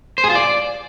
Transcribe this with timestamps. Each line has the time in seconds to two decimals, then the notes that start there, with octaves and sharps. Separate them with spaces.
0.18 C5
0.24 G#4
0.30 F4
0.35 D5